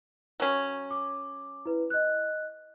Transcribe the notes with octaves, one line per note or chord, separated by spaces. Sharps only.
F#3 C#4
D6
E4 B4
D#5 F#6